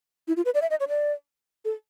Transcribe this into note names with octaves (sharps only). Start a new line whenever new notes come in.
E4
F4
B4
D5
E5
D#5
C#5
D5
A4